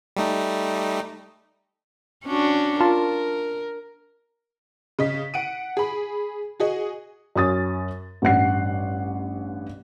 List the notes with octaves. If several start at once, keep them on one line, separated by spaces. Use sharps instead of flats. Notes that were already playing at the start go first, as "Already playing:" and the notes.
G3 A3 D#4
C#4 D4 F#4
F4 A#4 A5
C#3 D#5 B6
F#5 D7 D#7
G#4 B5
F#4 G#4 D#5
F#2 C#4 D#6 A6
A1 G2 F#5 C7